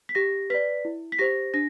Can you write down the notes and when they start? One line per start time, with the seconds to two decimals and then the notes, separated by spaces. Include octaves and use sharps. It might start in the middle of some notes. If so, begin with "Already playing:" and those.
0.09 B6
0.15 G4 A#6
0.50 B4 D5 B6
0.85 E4
1.12 B6
1.19 G4 C5 A#6
1.54 D4 A#6